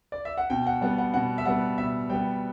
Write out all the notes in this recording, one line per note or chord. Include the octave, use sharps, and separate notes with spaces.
D5
E5
F#5
B2 G5
F#5
G3 B3 F#5
F#5
B2 F#5
E5
G3 B3 F#5
B2 E5
G3 B3 G5